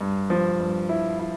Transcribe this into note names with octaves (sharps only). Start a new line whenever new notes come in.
G2
F3
G2
E4
E4